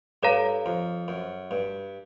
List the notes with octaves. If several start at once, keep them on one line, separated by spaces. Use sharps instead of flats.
G2 A4 C#5 F5 A#5
F2
F#2
G2